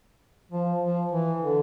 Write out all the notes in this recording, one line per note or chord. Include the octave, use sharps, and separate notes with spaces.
F3
F3
E3
D3